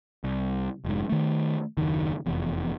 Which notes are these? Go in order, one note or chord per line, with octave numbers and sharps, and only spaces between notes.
C2
F1 G#2
D#3 A3
F#1 D#2 D#3
F1 E2